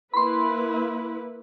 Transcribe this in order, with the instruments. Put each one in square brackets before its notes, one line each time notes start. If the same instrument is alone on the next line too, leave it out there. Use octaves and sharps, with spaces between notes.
[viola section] A#3 E4 B4 [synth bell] B5 C6